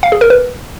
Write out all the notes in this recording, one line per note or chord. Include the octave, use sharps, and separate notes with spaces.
F5
G#4
A#4
B4